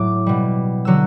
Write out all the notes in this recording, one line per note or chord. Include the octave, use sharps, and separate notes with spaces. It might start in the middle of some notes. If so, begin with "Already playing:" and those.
Already playing: A2 F#3 D6
B2 G3
D3 F#3 E6